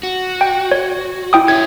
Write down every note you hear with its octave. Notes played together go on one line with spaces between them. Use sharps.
F#4
G5
C#5
E4 G5 D#6
G4 C#5 E5 G#6